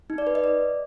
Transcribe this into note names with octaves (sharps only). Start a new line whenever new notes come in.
D#4
D5
B4
D#5
D5